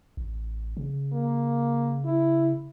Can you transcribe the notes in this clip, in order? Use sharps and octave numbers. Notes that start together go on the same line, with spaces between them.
A1
C#3
A#3
E4